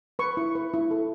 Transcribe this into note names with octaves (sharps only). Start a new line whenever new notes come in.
B4 C#6
E4
B4
E4
A4